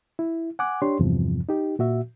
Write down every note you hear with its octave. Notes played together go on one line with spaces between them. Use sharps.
E4
F#5 G#5 D6 F#6
D4 G4 C#5 C6
E2 G2 C3 F3
D#4 G4
A#2 F#4 E5